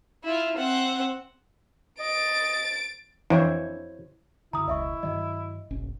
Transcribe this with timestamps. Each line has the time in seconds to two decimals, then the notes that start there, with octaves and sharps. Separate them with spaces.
0.24 E4 F4
0.57 C4 F#5
2.00 D#5 A6 D7
3.30 F2 E3 D4 E4 C5 C#5
4.53 F#2 D3 E4 A#5 D#6
4.68 E1 C#2 D#5 E5 C#6
5.03 G2 D#3 F#3 D#5
5.71 F#1 B1 C#4